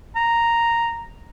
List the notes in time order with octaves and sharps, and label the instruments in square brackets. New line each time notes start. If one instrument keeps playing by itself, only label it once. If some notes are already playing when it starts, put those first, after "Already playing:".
[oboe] A#5